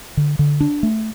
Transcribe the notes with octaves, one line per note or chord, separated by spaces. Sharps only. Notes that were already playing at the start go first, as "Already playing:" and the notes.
D3
D3
D4
A3